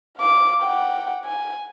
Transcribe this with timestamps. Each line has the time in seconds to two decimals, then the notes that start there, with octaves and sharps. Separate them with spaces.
0.17 F5 D6
0.63 F#5 G5
1.25 G#5